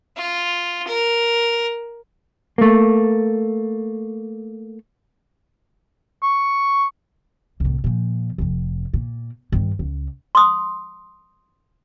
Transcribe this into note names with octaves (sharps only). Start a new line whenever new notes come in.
F4
A#4
A3 A#3
C#6
C2 A2
A#2 F3
F1 F2
A#2
G2 D#3
C#2
C6 D#6